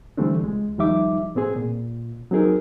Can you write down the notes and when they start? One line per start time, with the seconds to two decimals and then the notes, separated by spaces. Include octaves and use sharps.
0.17 D3 E3 G3 A3 C4 D4
0.44 C#2 G#3
0.78 D#2 F3 G3 D#4 E5 D6
1.35 A2 B3 C4 G#4
1.56 A#2
2.31 F#3 C4 D#4 G#4 A#4